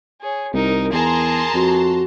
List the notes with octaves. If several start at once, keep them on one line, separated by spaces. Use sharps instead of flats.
G#4 C#5
C2 D#4 A#4
E2 G#4 A#4 A5 A#5 C6
F2 F#4